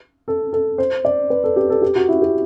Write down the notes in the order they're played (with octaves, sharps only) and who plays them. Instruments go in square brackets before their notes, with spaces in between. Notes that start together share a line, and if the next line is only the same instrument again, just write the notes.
[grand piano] A4
A4
C5
D5
B4
A4
G4
A4
G4
F#4
E4
G4